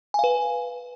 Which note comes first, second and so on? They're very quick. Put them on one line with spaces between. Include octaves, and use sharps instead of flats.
G#5 F5 B4